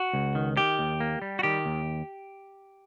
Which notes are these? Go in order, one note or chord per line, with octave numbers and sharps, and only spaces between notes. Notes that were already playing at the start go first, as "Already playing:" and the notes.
Already playing: F#4
C#2
D#3
D#3 G4
D#2
A#3
G3
F#4
D#3 G4
D#2